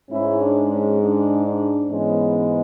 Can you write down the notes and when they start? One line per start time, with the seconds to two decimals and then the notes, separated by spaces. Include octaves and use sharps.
0.10 G#2 G#3 C#4 E4
0.40 D4
0.69 C#4
1.00 D4
1.45 D4
1.90 G#2 E3 G#3 B3 C#4